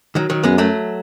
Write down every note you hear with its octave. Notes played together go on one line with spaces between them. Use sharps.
D#3 F#3
D#3 F#3
F#2 G#3 B3
F#3 A3